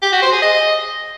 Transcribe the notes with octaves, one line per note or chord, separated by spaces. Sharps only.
G4
F#4
C5
G#4
D#5